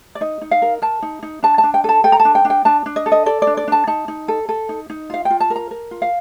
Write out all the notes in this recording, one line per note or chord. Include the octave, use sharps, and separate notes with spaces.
D5
D#4 D#5
D#4
F5
A#4
A#4 A5
D#4
D#4
D4 A5
A5
D4
G5
A4 A5
A4 G5
A#5
A5
D4
G5
D4
G5
D4 A5
D4
D#5
A4
D#5
A4 D5
D5
D4
D5
D4 A5
D#4 A5
D#4
A4
A4
D#4
D#4
F4 F5
G5
F4
A5
A#4
A#5
A#4
F4
F5